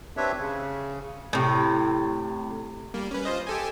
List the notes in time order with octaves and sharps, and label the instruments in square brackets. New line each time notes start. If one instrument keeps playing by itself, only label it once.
[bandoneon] C4 D4 G4 B4 C#5 E5
C#3
[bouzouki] A2 C3
[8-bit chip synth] G3 A#3
C#4 B4
F4 C5 D#5
G4 A4 G#5